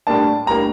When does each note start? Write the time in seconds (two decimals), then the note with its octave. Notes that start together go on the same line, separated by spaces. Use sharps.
0.07 A2 G3 A#3 D4 A5
0.46 A2 G3 A#3 D4 A#5